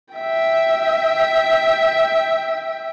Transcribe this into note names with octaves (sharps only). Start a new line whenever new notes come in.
E5 G5